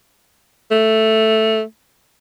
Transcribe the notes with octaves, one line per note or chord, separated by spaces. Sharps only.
A3